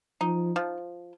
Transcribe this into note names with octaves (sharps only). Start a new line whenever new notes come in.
F3 D#4
F3